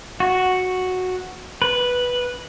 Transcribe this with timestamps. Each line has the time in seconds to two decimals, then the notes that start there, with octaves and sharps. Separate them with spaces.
0.20 F#4
1.62 B4